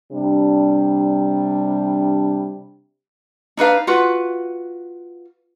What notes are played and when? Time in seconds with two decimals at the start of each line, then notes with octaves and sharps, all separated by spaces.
0.12 C3 G3 D4
3.57 D4 D#4 B4 F5
3.87 F4 F#4 B4